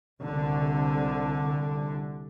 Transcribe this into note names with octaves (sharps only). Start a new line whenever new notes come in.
C2 D3